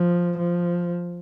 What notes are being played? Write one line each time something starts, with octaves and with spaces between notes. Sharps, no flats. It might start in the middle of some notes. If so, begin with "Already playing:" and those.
Already playing: F3
F3